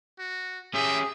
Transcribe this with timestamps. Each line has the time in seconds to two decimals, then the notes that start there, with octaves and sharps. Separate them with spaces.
0.19 F#4
0.74 C#4 G4 G#4 E5